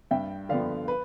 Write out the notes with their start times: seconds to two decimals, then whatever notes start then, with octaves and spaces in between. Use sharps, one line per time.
0.11 G2 E5 G5
0.49 D3 F3 B3 D5 F5
0.88 B4